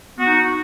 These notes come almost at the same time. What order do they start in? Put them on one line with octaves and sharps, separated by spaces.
B3 F#4 D#4